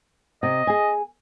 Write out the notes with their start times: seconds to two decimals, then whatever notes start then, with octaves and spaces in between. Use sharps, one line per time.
0.43 C3 D#5
0.67 G#4 G#5